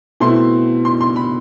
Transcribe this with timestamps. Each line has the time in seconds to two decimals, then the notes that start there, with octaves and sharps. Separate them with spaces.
0.20 B2 A3 C4 E4 C6
0.85 C6
1.01 C6
1.16 B5